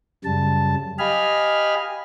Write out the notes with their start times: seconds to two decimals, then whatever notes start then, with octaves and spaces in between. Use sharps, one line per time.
0.25 F#2 C#3 G3 A5
0.99 G4 D#5 F5 G#5 B5 F6